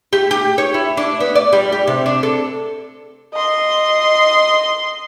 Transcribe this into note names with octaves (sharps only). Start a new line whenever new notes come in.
G4
G4
C#5
E4
D4
B3
D5
G3
G4
C3
D4
A4
D#5 C6